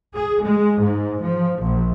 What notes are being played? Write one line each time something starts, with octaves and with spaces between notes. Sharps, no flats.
G#4
G#3
G#2
F3
A#1